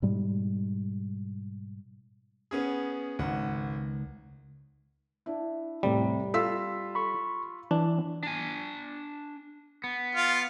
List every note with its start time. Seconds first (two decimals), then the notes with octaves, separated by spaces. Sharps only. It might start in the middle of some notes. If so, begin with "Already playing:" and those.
0.02 G#2 B2 G3 G#3
2.51 B3 C#4 G#4
3.19 G#1 C#2 D#3 F#5
5.26 D4 E4
5.83 E2 A2 C3 G3
6.34 F4 A4 E6 B6
6.95 B5 C#6
7.71 E3 D4
8.23 D4 G#5
9.84 B3
10.15 F4 F5